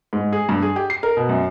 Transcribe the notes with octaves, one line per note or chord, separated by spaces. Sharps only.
G#2
G#4
G2
G#4
G4
C7
A#4
B2
F#2